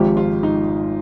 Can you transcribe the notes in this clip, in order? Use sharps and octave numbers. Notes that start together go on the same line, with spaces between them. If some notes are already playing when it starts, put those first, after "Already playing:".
Already playing: G#1 G#2 F3 G4
F4
D#4